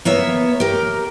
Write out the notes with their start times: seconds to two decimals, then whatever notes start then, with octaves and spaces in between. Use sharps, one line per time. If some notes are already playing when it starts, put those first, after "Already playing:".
0.05 A#3 B3 C#5 E5
0.60 G4 A#4